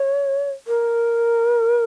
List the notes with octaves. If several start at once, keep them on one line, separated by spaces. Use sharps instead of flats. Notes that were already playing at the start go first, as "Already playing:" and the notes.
Already playing: C#5
A#4